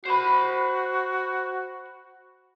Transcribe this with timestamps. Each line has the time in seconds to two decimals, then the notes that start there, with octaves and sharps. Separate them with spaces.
0.06 F#4 C5 B5